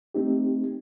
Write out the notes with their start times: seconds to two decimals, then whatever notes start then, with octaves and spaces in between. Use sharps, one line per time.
0.15 A3 C4 D#4 G4